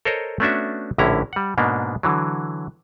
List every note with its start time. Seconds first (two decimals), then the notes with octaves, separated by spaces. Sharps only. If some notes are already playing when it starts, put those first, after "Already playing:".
0.05 A4 A#4 C5 C#5 D#5 A#5
0.40 A3 B3 C#4 D4 F#4 E5
0.98 A#1 A2 D3 C#4 E4 A#5
1.33 G3 F#5
1.58 G#2 B2 A#3 B3 D4
2.03 D3 E3 F#3